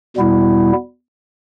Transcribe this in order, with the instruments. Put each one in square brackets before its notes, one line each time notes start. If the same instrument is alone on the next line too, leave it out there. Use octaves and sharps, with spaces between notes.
[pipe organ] E2 B2 G3 B3 E4